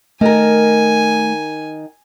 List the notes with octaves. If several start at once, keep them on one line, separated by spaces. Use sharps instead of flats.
D#3 A3 A#4 G#5